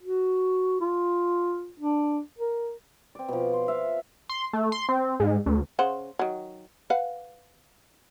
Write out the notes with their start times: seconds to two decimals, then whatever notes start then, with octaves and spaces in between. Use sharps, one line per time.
0.02 F#4
0.81 F4
1.80 D4
2.39 A#4
3.15 C4 D5
3.28 B2 F3
3.53 C6
3.68 E5 F5
4.29 C6
4.53 A3
4.72 C6
4.89 C4
5.20 G#2
5.46 D2
5.79 C#3 C5 F#5
6.19 D#3 F#3
6.90 B4 F5 F#5